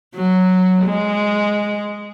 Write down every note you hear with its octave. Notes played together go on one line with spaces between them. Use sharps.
F#3
G#3